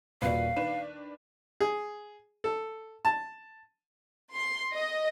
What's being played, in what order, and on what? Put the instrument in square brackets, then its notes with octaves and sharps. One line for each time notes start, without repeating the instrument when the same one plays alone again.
[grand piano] D#1 A#2 D5 [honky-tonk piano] F#4 B4 [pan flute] F5
[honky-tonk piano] D#3 D4 B4 [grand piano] E7
[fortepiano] G#4
A4
A5
[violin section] C6
D#5